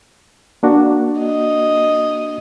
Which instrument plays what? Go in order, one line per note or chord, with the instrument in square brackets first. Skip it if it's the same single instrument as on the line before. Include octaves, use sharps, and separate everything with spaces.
[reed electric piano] A#3 D4 F#4
[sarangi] D#5